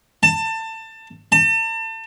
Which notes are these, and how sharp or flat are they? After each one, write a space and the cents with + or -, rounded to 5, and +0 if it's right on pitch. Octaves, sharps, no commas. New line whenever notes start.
A5 +25
A5 +40